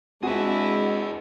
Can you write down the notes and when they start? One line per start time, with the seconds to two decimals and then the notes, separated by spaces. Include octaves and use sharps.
0.23 G#3 C4 D4 E4 F#4 G#4 B4